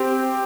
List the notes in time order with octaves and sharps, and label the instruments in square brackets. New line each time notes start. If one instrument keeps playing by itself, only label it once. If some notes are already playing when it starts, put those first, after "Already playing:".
Already playing: [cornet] C4 [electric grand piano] G4